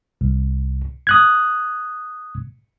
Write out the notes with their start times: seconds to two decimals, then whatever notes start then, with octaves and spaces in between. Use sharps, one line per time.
0.21 C2
1.07 D#6 F#6 G#6